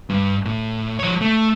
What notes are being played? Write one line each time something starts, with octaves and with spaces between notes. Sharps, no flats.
G2
A2
F3 C#5
A3